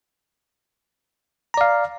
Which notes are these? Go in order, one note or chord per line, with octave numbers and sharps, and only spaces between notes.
D5 F5 A#5